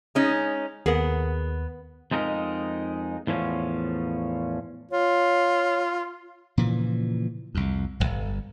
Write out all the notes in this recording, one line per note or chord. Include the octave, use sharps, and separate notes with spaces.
G#3 C#4 D#4
D#2 B3 G#4 A#4 F#5
F2 G#3 D#4 A#4
E2 A2 F3 C#4
F4 C#5
A#2 C#3 E3 F3
C2 F2
D1 G1